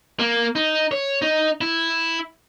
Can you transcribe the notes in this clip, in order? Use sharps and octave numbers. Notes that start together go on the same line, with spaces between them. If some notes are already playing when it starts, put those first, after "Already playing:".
A#3
D#4
C#5
D#4
E4